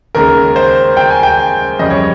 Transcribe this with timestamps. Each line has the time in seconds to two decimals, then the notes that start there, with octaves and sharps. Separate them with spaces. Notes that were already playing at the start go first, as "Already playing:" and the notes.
0.15 D#2 C#3 G#3 A#4
0.56 C5
0.97 G5
1.10 G#5
1.23 G5
1.79 F2 C#3 G3 D#5
1.90 C#5